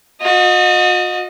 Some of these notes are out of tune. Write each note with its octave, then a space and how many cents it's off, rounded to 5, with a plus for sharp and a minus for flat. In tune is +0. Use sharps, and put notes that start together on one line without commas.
F#4 -45 D#5 +0